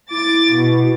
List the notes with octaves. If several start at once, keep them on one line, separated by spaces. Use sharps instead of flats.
E4 D6 A6
B2